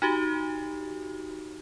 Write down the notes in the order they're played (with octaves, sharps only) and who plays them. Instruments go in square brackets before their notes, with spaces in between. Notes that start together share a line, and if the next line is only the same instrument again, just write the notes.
[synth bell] D#4 F#4 G4